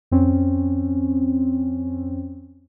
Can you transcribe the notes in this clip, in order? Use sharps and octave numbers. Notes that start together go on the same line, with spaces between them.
F2 C4 C#4